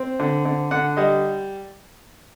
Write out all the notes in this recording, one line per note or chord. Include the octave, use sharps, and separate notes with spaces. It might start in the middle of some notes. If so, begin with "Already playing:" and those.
Already playing: C4
D3
D3
D3 F#5
G3 D#5